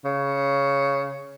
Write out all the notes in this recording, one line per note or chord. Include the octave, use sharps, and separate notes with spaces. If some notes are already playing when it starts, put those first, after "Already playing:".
C#3